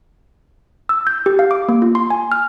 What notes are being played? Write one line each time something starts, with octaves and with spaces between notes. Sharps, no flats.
E6
G6
G4
F5
D6
A#3
F4
C6
G#5
F6